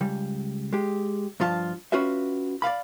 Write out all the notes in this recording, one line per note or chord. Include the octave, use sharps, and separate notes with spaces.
C#2 G3
G#3 G4
G2 F3 F4 A#4 A5
C#4 F4 F#4 B4 E5
D5 D#5 F5 B5